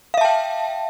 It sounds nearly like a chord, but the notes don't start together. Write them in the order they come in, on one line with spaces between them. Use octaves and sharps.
F5 E5 A5 G5